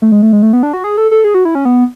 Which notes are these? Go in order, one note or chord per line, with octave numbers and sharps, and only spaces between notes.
A3
G#3
A3
G#3
A3
B3
D4
F#4
G#4
A4
A4
G#4
F#4
E4
C#4
B3